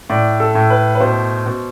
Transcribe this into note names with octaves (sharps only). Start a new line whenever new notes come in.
A2 D5
A4
A2
B4
B4
B2 C5
B2